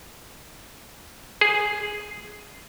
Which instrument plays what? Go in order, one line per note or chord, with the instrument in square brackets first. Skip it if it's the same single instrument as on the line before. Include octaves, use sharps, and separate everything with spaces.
[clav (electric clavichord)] G#4